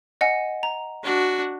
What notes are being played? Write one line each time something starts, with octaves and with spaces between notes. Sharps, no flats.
D#5 F#5 G#5
A#5
D4 F#4